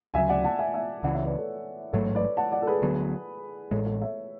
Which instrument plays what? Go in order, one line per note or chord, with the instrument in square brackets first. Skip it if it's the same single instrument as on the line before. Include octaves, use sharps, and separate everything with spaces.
[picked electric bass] D2 C#3 F#3 [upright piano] E5 G#5
[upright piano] D5 F#5
F#5 A5
E5 G#5
E5 G#5
[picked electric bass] C#2 C#3 E3 [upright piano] D5 F#5
[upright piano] C#5 E5
B4 D5
A4 C#5
[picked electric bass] A1 G#2 F#3 A3 [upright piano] A4 C#5
[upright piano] B4 D5
F#5 A5
D5 F#5
A4
G#4 B4
[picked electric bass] D2 D3 F#3 B3
[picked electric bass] A1 A2 G#3 [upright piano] A4 C#5
[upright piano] A4 C#5
C#5 E5